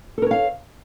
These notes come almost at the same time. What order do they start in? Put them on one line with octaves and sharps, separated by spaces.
A4 A#4 C#5 F5